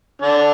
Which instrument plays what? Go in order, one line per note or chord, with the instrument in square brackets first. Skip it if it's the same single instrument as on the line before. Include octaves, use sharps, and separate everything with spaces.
[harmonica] D3 D4